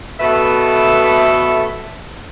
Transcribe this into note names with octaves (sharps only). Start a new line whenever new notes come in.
B2 A3 A4 B4 E5